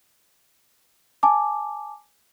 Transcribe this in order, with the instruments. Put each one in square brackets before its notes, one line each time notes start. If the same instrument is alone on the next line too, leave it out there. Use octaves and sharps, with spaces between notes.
[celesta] G#5 A5 D6